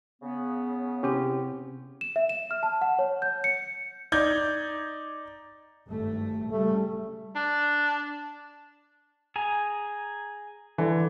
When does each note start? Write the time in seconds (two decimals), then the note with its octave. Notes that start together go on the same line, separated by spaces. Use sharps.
0.22 C#3 B3
1.03 C3 C4 C#4 E4 G4
2.01 E7
2.16 E5
2.29 E7
2.51 F6
2.63 A5
2.81 F#5
2.99 C#5
3.22 G6
3.44 C#7
4.12 D#4 D5 G6 G#6
5.88 G#1 G2 A3
6.51 C#3 G3 A3
7.35 D4
9.36 G#4 G#5 A#5
10.78 D3 E3